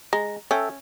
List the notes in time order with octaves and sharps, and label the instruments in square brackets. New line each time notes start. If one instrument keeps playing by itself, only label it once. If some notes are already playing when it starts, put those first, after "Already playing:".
[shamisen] G#3 [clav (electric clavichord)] A#5
[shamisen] C#4 [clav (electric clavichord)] A4 E5 G5